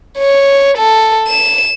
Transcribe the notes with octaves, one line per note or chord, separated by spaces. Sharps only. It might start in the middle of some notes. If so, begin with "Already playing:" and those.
C#5
A4
E7